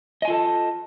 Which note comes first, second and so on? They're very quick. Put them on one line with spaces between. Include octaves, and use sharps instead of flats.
D#5 G#5 F4 A4 A5